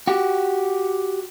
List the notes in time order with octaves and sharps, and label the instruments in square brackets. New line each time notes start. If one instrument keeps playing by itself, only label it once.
[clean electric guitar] F#4 G4